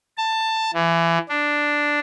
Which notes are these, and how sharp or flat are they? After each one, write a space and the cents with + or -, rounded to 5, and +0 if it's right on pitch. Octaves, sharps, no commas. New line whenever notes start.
A5 +15
E3 +25
D4 +0